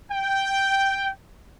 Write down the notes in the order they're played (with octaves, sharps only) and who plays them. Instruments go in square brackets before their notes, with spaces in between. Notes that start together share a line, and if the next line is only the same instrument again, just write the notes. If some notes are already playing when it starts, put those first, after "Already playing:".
[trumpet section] G5